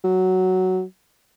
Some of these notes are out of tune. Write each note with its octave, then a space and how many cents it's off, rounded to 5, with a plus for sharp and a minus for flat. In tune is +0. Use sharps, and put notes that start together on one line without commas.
F#3 +5